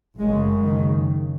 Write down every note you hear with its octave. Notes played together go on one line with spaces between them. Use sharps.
F#1 F#2 C#3 G#3
D#3